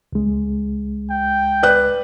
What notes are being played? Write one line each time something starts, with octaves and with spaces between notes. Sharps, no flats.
C#2 G#3
G5
B4 D5 F#6